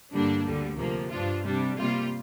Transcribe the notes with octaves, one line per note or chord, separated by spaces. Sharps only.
G2 D3 G3 A#3 D4
D2 D3 G3
D2 C3 F3 A#3
G2 F3 D4 F4
C3 G3 D4
C3 G3 A#3 F4